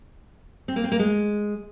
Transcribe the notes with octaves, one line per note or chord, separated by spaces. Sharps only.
C4
A#3
C4
A#3
G#3